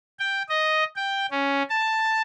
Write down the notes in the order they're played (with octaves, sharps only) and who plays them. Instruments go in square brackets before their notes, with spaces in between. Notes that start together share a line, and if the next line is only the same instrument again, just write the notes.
[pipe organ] G5
D#5
G5
C#4
A5